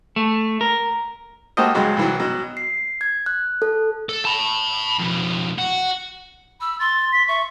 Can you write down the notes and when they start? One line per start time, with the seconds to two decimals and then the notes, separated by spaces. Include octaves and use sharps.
0.16 A3
0.61 A#4
1.57 A#3 F#4 G4 A4 C5 D#5
1.75 C#2 G2 F#3 G#3
1.97 C2 E3 F#3
2.20 B2 F#3
2.57 C7
3.01 G#6
3.26 F#6
3.62 A4
4.09 A4
4.25 A5 B5
4.99 F2 B2
5.58 F#4
6.60 B5 E6
6.79 C6 A6
7.12 B6
7.28 E5 C#6